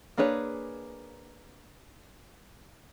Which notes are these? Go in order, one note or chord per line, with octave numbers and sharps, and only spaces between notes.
A#3 D4 G#4 B4 C#5